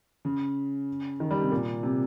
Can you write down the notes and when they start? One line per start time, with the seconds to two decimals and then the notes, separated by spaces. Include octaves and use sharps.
0.25 C#3
1.20 D#3
1.31 G3
1.41 C3
1.52 A#2
1.83 C3